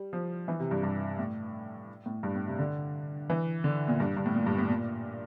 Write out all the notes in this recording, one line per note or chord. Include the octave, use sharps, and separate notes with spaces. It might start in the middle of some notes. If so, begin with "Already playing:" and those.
Already playing: G3
F3
E3
C3
G2
G2
A2
A2
G2
A2
C3
D3
E3
D3
A#2
G2
G2
A2
A#2
G2
A2
A#2